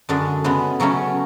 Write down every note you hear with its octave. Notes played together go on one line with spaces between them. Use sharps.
F#2 D3 G#3 D4
C#3 G#3 B3
C#3 F#3 A3 C#4